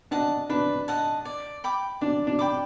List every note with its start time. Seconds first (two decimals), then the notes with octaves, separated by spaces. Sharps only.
0.11 D4 D#5 F#5 A5
0.50 D4 B4
0.88 D#5 F#5 A5
1.25 D5
1.64 G5 B5 D6
2.01 D4 D5
2.27 D4
2.39 G5 B5 D6